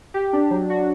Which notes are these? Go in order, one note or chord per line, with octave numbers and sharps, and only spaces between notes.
G4
D4
F#3
F#4